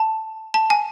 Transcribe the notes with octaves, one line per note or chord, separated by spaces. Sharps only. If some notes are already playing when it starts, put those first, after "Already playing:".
Already playing: A5
A5
G#5